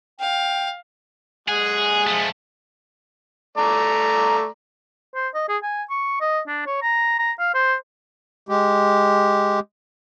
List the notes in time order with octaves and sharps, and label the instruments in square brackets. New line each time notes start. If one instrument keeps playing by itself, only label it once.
[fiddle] F5 [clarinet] G5
[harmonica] G#3 F#5 G#5 [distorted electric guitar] G#4
[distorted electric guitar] F3 A3
[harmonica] A3 D5 A#5
[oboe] C5
D#5
G#4
G#5
C#6
D#5
D4
C#5
A#5
A#5
F5
C5
[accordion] G#3 G4